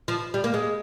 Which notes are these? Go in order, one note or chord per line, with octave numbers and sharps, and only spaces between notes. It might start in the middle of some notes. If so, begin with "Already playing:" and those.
F3
G3
A#3
G#3